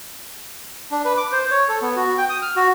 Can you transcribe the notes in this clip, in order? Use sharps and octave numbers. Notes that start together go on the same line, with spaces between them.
D4
B4
D6
C5
C#5
A4
B3
F#4
G5
D#6
F6
F#4